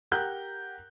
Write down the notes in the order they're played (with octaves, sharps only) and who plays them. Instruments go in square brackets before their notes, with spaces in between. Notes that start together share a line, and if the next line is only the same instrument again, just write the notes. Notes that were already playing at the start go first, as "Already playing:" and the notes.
[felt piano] G4 A#4 F#5 A#5 F#6 G6